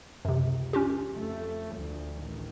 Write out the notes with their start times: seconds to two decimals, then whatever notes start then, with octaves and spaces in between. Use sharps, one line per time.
0.25 C#2 F#2 C3
0.73 C#4 F4 G4
1.16 F2 A3
1.76 D2 F3
2.19 A1 D#3